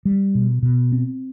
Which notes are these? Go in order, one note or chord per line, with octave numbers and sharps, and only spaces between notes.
G3
B2
B2
C4